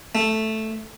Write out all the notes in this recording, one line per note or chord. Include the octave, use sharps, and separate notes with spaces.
A3